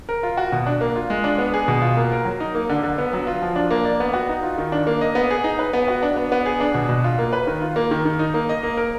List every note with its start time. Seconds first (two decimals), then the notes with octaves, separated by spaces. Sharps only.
0.09 A#4
0.23 F4
0.37 F#4
0.52 B2
0.66 D4
0.81 A#3
0.96 F4
1.10 G#3
1.24 D4
1.38 B3
1.54 G#4
1.68 B2
1.82 F4
1.97 A#3
2.12 A#4
2.25 F#3
2.40 D#4
2.55 A#3
2.69 D3
2.83 D3
2.98 B3
3.13 F#3
3.27 F4
3.42 F3
3.56 D4
3.71 A#3
3.85 D5
4.00 B3
4.13 F#4
4.29 D#4
4.43 F4
4.58 D#3
4.72 D4
4.87 A#3
5.01 D#5
5.15 B3
5.31 G#4
5.44 D#4
5.59 B4
5.73 B3
5.88 F#4
6.03 D4
6.16 B3
6.32 B3
6.46 G#4
6.61 D4
6.74 B2
6.89 B2
7.04 F4
7.19 A#3
7.33 B4
7.47 D#3
7.62 F4
7.76 A#3
7.91 D#3
8.05 D#3
8.19 D#4
8.34 A#3
8.49 D#5
8.63 A#3
8.77 A#4